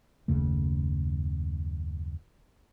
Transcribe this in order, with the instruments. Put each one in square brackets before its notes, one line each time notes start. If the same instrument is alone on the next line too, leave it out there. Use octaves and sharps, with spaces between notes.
[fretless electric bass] F#1 D#2 C#3 A3